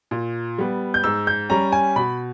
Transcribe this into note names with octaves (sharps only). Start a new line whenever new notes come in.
A#2
G3 B3
G6
G#2 E6
G6
G3 C#4 A#5
G#5
B2 B5